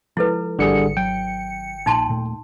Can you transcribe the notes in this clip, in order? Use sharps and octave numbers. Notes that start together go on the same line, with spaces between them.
F3 G#3 E4 A4 B4
G#1 D3 G3 G#4 C#7
F#3 G5
A#1 A#2 D#4 A5 C6
D#2 A#2 A3